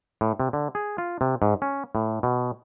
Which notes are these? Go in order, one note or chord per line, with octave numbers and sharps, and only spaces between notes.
A2
C3
D3
G#4
F4
C3
G#2
C#4
A2
B2